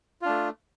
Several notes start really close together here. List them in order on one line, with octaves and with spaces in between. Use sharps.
F4 D4 A3